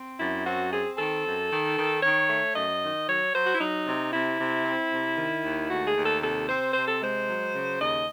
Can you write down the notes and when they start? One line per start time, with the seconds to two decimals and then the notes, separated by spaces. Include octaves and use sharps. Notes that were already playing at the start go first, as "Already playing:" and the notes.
Already playing: C4
0.19 F#2 E4
0.45 C4 F#4
0.72 C4 G#4
0.94 G#4
0.98 D#3 A4
1.25 F#2
1.50 D#3
1.76 D#3
2.03 D#3 C#5
2.28 A3
2.54 F#2 D#5
2.82 D#3
3.07 F#3 C#5
3.33 F#3 C5
3.44 F#4
3.52 E4
3.59 F#3 D#4
3.85 C3
4.11 C3 E4
4.39 C3
4.64 C4
4.91 C3
5.17 D#3
5.43 D#2
5.69 A3 F#4
5.87 G#4
5.95 D#2
6.04 A4
6.21 C3 A4
6.47 C4 C5
6.74 C3 C5
6.87 A4
7.00 G#3 C5
7.27 F#3
7.52 C#3
7.78 D#2 D#5